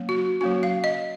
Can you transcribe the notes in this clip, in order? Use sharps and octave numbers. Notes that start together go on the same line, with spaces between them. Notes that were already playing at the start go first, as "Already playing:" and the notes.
Already playing: F#3 A#3 C#4
F#4
F#3 A#3 C#4 F#4
F5
D#5